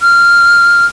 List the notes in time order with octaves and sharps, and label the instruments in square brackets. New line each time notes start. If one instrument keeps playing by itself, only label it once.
[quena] F6